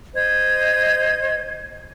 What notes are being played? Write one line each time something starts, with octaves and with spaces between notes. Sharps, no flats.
C5 D#5 G#6